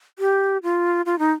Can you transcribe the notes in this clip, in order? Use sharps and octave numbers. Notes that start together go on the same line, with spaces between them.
G4
F4
F4
D#4